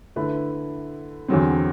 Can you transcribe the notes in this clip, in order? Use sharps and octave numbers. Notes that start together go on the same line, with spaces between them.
D3 A3 E4 B4
E2 D3 F#3 C4